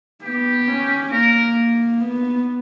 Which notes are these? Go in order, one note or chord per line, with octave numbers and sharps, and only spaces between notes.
B3 G4
C#4
A#3 A#4
B3